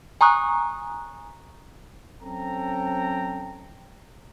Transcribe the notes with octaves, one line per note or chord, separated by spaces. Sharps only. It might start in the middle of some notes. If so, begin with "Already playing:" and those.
G#5 A#5 C#6 D#6 F#6
F#3 C4 C#4 A4 G5 A#5